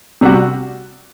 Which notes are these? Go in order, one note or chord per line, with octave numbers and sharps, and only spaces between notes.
C3 G3 D4 F#4